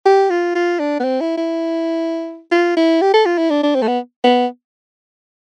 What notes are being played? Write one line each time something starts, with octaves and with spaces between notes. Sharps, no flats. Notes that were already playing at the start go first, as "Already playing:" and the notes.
G4
F4
F4
D4
B3
C4
E4
E4
F4
E4
G4
A4
F4
E4
D4
D4
C4
A3
B3
B3